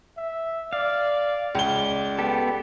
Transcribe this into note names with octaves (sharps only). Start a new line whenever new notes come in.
E5
D5 F5
C#2 D5 G7
B3 G4 A4